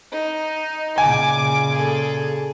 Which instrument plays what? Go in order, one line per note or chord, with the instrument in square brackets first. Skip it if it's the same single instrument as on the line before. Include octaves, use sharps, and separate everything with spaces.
[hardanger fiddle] D#4
[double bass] A#2 C#3 [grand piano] G#5 [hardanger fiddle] D6
[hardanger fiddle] G#4 A4